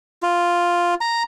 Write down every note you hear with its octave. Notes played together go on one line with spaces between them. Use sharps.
F4
A#5